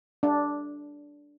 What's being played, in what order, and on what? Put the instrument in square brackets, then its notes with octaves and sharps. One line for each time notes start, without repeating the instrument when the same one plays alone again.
[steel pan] D4